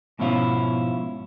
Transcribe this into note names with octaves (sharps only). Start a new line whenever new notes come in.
G#2 B2 F3 C#4 E4 F4